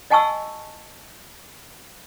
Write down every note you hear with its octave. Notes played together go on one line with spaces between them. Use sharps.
D#5 F#5 G#5 A5 C#6 E6